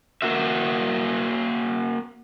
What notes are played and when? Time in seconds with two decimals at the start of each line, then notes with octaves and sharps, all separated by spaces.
0.22 A#3 F#4 E5